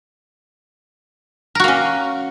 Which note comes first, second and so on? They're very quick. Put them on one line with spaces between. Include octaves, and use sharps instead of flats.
A#4 F#4 A#3 C#4